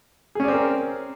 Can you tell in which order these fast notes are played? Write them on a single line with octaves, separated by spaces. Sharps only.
G#4 C#4 D5 C4 A#4